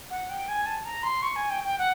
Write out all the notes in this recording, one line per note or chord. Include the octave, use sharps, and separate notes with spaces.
F#5
G5
G#5
A5
A#5
C6
C#6
G#5
G5
G5
F#5